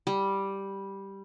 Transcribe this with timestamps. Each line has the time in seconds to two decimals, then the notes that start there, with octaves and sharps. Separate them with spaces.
0.07 G3